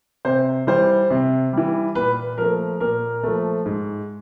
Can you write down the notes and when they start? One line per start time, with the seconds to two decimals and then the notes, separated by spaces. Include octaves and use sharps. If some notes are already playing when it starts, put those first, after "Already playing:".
0.25 C3 C5
0.67 E3 G3 C5
1.10 C3
1.53 E3 G3
1.95 A#2 B4
2.38 F3 A3 A#4
2.80 A#2 A#4
3.23 F3 A3
3.66 G#2